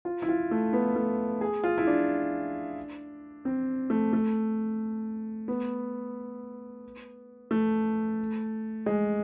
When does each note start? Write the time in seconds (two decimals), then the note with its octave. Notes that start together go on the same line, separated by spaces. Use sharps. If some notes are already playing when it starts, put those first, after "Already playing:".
0.05 F4
0.22 E4
0.29 F4
0.51 A3
0.73 B3
0.96 A3
1.41 G#4
1.64 F4
1.78 E4
1.87 D4
3.45 C4
3.90 A3
4.13 A3
5.48 B3
7.51 A3
8.86 G#3